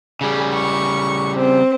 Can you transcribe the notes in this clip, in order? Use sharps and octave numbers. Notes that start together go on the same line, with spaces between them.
C#3 G3 G#4
C#6
C4